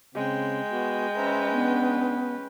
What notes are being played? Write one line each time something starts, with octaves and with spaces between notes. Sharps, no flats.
C#3 G#3 C4 G5
B3 F#4
C#4 B4 C5 E5 A#5
B3 D4